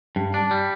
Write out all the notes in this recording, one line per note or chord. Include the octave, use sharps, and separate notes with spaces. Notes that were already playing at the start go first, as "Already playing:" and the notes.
G2
D4
G3